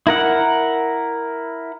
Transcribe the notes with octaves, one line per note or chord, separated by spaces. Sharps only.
E4 A#4 F#5